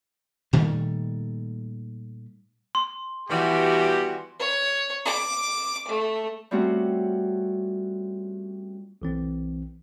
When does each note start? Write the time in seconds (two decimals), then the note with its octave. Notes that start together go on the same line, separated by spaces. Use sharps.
0.53 A#2 D#3 G3 A3
2.75 C6
3.29 B2 E3 G3 F#4 G4
4.39 C#5
5.05 D6
5.88 A3
6.51 G3 A3 C4 C#4 F4 F#4
9.02 B1 E3 C4